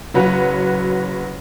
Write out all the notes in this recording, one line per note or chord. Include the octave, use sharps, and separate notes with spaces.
F#1 F#3 B4 F#5